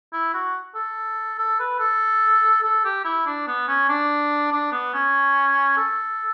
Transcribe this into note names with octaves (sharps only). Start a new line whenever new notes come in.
E4
F#4
A4
A4
B4
A4
A4
G4
E4
D4
B3
C#4
D4
D4
B3
C#4
A4